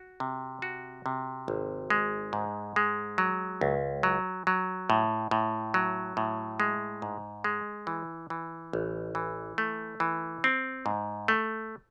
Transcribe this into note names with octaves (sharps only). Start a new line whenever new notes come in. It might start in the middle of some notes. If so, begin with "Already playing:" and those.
Already playing: F#4
C3
F#4
C3
G#1
G#3
G#2
G#3
F#3
C#2
F#3
F#3
A2
A2
F#3
A2
G#3
G#2
G#3
E3
E3
A1
E3
A3
E3
C4
G#2
A3